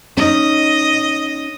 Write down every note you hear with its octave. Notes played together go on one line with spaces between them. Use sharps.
C#4 D#4 D#5